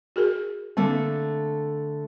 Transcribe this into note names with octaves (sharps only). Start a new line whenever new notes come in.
F#4 G#4 A#4
D3 A3 A#3 C4